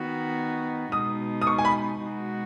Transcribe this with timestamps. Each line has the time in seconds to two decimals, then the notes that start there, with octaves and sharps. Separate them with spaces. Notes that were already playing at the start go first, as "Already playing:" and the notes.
Already playing: D#3 B3 D#4 F#4
0.92 B2 G#3 D#4 D#6
1.42 D#6
1.47 C#6
1.58 G#5
1.65 B5
2.02 B2 G#3 D#4 F#4